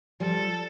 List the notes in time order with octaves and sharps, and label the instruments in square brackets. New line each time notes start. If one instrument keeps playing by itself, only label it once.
[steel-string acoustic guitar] F3 G3 [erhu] A4